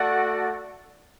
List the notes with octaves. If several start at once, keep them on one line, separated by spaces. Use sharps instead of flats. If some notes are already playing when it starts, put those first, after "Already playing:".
Already playing: A3 F#4 A4 D5 F#5